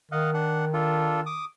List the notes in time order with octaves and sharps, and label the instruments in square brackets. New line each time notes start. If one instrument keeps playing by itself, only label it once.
[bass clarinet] D#3 [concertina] D#5 F5 F#5
[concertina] D4 F#5
D4 F4 A4
D6 D#6